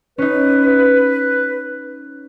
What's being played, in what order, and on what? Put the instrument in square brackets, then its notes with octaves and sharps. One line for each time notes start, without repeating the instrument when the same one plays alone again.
[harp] C#4 D#4 [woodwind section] B4